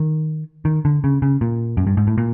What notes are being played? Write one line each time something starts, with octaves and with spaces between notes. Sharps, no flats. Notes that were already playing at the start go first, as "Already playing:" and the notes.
Already playing: D#3
D#3
D3
C#3
C#3
A#2
F#2
G2
G#2
A2
A#2